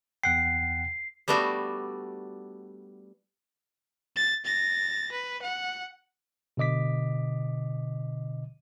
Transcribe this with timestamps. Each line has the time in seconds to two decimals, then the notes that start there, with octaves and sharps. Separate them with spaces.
0.24 E2 F#5 G5 C7
1.28 G3 A3 B3 D4 F#4
4.16 A6
4.45 A6 A#6
5.11 B4
5.42 F#5
6.57 B2 D3 D#5 D6 B6